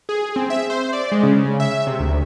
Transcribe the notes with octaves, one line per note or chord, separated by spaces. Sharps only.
G#4
C4
E5
C5
D5
G#3
C#3
E5
C3
D2